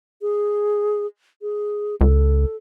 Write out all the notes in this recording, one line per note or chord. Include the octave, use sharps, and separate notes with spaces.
G#4
G#4
C#2 A4